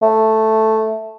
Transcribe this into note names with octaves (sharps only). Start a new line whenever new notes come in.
A3